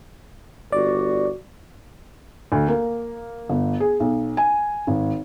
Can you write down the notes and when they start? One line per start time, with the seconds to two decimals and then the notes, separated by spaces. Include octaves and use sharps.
0.72 G1 F#4 D5
2.52 D2
2.68 A#3
3.49 G1
3.80 G#4
4.00 B1
4.37 G#5
4.87 G#1